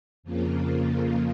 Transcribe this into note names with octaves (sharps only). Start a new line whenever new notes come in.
F2 C#3 F3 A#3